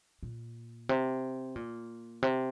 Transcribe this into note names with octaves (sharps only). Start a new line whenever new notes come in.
A#2
C3
A#2
C3